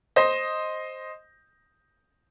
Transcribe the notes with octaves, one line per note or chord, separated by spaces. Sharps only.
C5 D#5